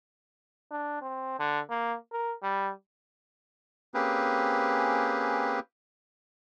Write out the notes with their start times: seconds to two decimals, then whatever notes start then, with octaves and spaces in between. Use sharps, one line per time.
0.71 D4
1.02 C4
1.39 D3
1.70 A#3
2.12 A#4
2.43 G3
3.94 A#3 C4 C#4 G4 G#4 B4